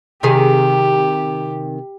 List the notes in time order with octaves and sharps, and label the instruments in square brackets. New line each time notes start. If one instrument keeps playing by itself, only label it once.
[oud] C3 D#3 G#4 [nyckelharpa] G4